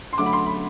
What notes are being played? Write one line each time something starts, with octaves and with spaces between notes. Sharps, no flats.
C6
D3 F#3 A3 D6
B5
C6
B5